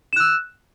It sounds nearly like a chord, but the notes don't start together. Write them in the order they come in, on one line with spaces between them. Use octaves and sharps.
E7 F#6 E6